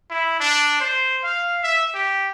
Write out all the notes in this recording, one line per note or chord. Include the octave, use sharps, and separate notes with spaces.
E4
D4
C5
F5
E5
G4